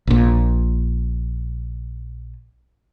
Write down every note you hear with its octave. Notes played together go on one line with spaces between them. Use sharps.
A#1 A#2